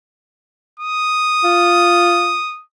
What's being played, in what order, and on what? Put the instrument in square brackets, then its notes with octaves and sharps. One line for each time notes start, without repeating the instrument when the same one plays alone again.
[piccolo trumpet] D#6
[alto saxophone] F4